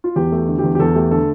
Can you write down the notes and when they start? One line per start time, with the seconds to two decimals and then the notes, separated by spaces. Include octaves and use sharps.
0.04 F4
0.16 E2 G4
0.32 A3
0.38 G4
0.48 D3
0.59 G4
0.64 E2
0.75 G4
0.79 E2 A4
0.95 A3 G4
1.11 D3 A4